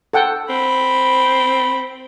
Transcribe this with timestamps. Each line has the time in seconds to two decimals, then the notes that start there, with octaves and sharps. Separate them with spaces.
0.13 A4 F#5 G5
0.50 C4 B5